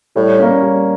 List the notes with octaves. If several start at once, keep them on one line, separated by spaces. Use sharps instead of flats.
A2 G3
A#3 C#4
G3